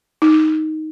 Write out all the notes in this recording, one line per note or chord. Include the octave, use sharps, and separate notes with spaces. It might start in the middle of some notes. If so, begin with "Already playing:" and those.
D#4